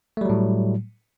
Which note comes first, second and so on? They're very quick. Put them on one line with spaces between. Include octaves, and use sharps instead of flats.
A3 G3 F#3 A2